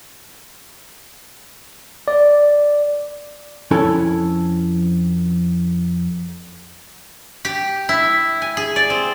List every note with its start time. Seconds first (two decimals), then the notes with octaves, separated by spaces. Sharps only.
2.08 D5
3.71 F2 C#4 E4 A4 G#5
7.45 G4
7.89 E4
8.42 G#5
8.57 G#4
8.76 D5
8.90 C4